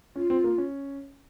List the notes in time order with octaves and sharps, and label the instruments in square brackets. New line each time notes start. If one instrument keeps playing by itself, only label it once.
[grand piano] C#4 [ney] F4
[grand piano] C4
A#3
C#4